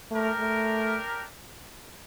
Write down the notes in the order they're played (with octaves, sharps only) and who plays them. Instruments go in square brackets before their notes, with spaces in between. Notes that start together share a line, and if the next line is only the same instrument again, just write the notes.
[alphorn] A3 [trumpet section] D4 G4 A#4
[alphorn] A3